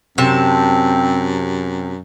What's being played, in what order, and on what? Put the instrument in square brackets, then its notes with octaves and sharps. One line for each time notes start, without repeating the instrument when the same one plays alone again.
[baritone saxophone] F#2 [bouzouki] C3 A5 [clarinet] C4